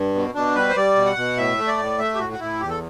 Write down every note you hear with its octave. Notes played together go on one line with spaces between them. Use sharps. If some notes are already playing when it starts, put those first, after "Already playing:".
Already playing: G2
B2
B2 D4
G3 B4
C5
G3 D5
B2
F#5
B2
A2 E5
A3
D5
A2
A3 E5
G4
A2 F#4
F#4
A2 E4
E2 G4
A4